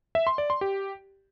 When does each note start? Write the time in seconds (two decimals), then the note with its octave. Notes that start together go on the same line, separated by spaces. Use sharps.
0.15 E5
0.27 C6
0.38 D5
0.50 C6
0.61 G4